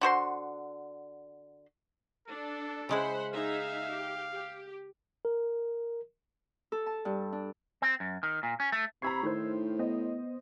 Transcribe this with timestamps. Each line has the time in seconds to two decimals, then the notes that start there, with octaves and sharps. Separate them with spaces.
0.01 D3 F#4 C5 C6
2.28 D4 A4
2.89 C#3 G#3 E4 C5 F#5 B5
3.32 D#4 G#4 E5 F5
3.90 G4
4.32 G4
5.25 A#4
6.72 A4
6.86 A5
7.05 G2
7.33 D4
7.82 C4
8.00 F#2
8.23 D#3
8.43 A#2
8.60 C#4
8.72 A3
9.02 C3 A#5 B5 C#6 E6 G#6 C7
9.23 A2 D#3 C5
9.79 B3 C5 D#5